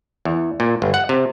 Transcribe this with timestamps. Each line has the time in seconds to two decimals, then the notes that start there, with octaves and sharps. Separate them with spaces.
0.25 E2
0.60 A#2
0.82 G1
0.94 F#5
1.09 C3